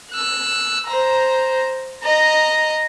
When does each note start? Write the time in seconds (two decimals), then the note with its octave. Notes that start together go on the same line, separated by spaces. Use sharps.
0.12 E6 F#6
0.87 C5 A#5
2.04 D#5 A#5